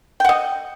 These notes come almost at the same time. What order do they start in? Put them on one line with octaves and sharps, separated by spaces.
G5 F#5 D#5